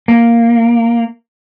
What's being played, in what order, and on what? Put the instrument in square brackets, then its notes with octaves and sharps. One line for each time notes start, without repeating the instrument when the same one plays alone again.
[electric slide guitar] A#3